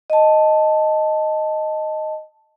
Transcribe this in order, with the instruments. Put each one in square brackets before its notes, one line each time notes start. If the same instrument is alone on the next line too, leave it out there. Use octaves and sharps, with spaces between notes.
[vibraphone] D#5 A5